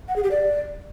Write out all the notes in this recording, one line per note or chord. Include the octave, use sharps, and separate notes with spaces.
F#5
G#4
G4
D5